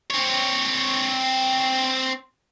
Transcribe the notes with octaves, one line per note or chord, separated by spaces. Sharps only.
C4 C#5